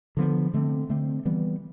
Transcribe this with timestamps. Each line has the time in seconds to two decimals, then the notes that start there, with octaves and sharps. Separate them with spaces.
0.17 D3 F3 B3
0.54 D3 A3 C4
0.89 D3 A3 C4
1.25 E3 G3 B3